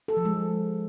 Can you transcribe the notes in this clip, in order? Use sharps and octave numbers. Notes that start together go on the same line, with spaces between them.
A4
F3
G#3